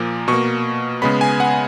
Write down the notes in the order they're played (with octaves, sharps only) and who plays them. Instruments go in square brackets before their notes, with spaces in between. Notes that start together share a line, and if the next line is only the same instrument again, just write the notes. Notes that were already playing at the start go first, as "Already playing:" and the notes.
Already playing: [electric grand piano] A#2 F3 A#3
B2 A#3 C#6
C#3 G#3 B3 B5
G#5
F#5